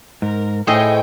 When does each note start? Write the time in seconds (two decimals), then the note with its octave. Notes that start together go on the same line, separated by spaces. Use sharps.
0.22 G#2 A#4
0.67 A2 A3 G#4 C5 D#5 G5 G#5